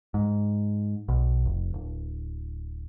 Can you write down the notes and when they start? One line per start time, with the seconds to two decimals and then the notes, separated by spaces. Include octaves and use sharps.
0.14 G#2
1.09 B1
1.46 F1
1.74 D1